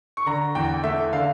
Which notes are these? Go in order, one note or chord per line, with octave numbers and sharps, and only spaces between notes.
C#6
D3 A#5
E2 G5
A3 E5
D3 F5